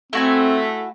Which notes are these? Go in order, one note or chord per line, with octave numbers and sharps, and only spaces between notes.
A3 C4 E4 F#4 G#5